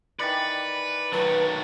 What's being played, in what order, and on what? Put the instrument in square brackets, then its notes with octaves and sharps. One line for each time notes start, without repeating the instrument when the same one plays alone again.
[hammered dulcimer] D#3 E3 D5 [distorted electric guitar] B4 [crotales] A6 C#7 F#7
[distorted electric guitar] D#3 F#3 [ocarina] B4 [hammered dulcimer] A5